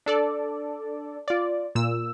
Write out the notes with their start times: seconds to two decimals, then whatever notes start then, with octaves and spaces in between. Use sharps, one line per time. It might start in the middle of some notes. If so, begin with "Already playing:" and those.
0.06 D4 A4 D5
1.28 F4 D5
1.75 A#2 E6